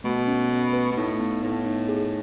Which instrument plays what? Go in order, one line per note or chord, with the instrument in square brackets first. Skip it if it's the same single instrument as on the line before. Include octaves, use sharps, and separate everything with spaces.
[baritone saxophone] B2 [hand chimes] A3
[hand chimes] C#4
A3
B4
[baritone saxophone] B2
[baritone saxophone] A2 [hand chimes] D#4
[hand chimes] B3
[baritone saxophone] A2 [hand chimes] B3
[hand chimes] D#4
G#4